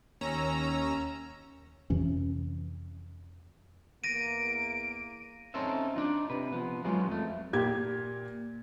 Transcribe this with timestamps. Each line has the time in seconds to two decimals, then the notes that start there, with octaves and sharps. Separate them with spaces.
0.21 D#2 C#4 A#5 E6
1.90 F2 C3 E3 C#4
4.04 E2 A#3 A#6 D7 D#7
5.54 C4 C#4 D#4 A4 C5 E5
5.94 D4 D#4 F4
6.30 C3 B4
6.52 F3 B3
6.85 F#3 G#3 B3 C#4 F4 G#4
7.08 F2 A3
7.53 A#2 G4 G#6